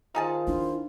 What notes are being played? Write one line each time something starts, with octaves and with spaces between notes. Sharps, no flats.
D#3 D#4 F4 G#4 C5 A5
D4 E4